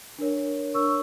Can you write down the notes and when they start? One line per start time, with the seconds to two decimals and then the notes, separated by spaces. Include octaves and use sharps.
0.18 D4 A#4 C#5
0.74 D4 A#4 C#5 C#6 E6